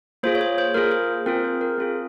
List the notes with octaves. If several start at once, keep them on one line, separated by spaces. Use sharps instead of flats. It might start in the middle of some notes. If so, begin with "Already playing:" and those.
A#3 F4 G#4 C5
C#5
C5
C5
A#3 F4 G#4 A#4
C5
C4 F4 G#4 A#4
C5
A#4
C4 F4 G#4